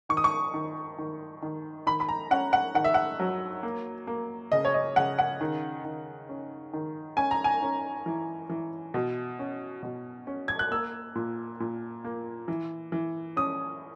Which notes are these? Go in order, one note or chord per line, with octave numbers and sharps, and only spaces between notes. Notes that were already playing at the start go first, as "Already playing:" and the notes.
D#3 C#6
D#6
C#6
D#3
D#3
D#3
D#3 B5
B5
A#5
C#4 F#5
F#5
D#3 F#5
E5
F#5
F#3
A#3
A#3
C#3 D#5
C#5
D#5
C#3 F#5
F#5
D#3
D#3
C#4
D#3
C#4 G#5
A#5
G#5
C#4
E3
E3
B2
C#4
B2
C#4
G#6
F#6
A#3 E6
A#2
A#2
A#3
E3
E3
C#4 D#6